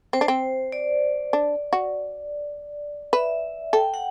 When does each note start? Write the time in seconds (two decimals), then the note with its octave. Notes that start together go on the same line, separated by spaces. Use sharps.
0.13 C4 C5
0.21 D4
0.28 C4
0.72 D5
1.33 D4
1.73 F#4
3.13 B4 E5
3.73 A4 G5
3.94 F#5